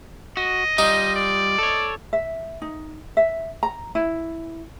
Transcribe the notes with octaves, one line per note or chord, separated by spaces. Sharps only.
F#4 D#5
G3 D#4 F4
D5
A4 C#5
E5
D#4
E5
A#5
E4